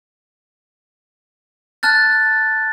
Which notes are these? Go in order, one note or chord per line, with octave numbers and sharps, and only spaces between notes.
A5 F6 F#6 A6